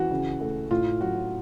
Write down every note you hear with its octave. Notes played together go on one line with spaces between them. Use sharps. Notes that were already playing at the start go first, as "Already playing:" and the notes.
Already playing: E3 F#4
C#3
A3
A2 F4
F#3 F#4